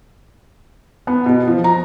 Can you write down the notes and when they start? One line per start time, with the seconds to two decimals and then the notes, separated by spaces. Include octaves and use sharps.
1.07 B3
1.26 B2
1.47 F3
1.64 A#5